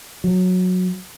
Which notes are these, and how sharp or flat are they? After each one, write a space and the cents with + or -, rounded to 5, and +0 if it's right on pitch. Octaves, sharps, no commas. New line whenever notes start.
F#3 -15